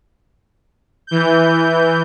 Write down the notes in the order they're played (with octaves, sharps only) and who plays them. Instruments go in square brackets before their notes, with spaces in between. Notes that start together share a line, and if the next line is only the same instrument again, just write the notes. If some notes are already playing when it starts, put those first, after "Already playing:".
[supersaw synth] E3 G6